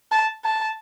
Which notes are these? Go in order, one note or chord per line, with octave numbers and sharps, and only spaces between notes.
A5
A5